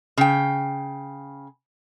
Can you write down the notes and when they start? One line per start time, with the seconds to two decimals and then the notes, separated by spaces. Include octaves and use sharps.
0.17 C#3 G5